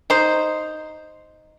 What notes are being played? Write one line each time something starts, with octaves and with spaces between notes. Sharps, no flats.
D#4 C5